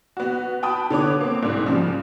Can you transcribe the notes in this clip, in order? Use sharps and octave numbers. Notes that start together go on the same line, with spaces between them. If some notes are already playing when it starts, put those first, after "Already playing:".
B3 F#4
G5 A5 B5 D#6
D3 B3 C#5 D6
A#3 C4
C2 G#2
C#3 F3 G3